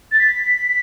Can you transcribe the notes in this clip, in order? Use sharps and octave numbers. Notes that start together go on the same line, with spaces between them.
A6
B6